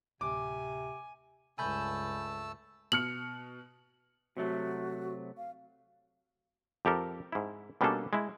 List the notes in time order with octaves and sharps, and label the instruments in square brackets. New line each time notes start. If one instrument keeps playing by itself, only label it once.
[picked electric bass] D1 D2 [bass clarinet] C3 [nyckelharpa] G#5 [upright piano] D6
[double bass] C#2 G2 [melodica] A3 A5 E6 [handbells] G#5 B5 G6
[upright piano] B2 F6 C#7 [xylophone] F#7
[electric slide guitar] C3 F#3 A3 [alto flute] F#4
[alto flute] F5
[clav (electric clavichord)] F2 G4 A4 A#4
G#2 E4
B2 G3 A#3 C#4 D4 A4
G#3 E4